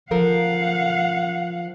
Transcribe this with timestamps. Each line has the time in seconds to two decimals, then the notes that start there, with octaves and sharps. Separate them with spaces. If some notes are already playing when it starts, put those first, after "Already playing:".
0.11 F3 A4 A#4 F5 F#5